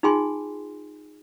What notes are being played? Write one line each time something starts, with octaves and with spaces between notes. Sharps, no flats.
D#4 F4 G#4 G5 G#5 C6